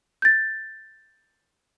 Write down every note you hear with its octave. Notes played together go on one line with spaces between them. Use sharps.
G6 A6